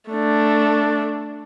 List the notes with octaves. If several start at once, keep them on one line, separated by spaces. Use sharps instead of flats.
A3 D4